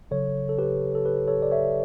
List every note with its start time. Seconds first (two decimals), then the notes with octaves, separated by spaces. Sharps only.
0.11 C#3 F#3 A4 C#5
0.49 A4
0.58 G4 B4
0.95 A4
1.05 G4 B4
1.28 A4 C#5
1.42 D5
1.51 C#5 E5